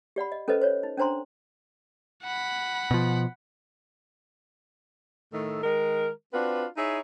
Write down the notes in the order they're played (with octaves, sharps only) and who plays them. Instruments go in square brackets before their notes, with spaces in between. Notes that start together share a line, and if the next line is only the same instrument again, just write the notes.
[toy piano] G4 D5 F#5 B5
D#5
C#4 A4 B4 C5 D#5
C5 C#5
D#4
C#4 D4 C5 A#5 C6
[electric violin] F#5 B5
[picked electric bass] B2 F3
[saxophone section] A2 D#3 A3 A4
D#3 G#3 A#4
C4 D4 F4 F#4 B4
D#4 E4 G#4 C#5 E5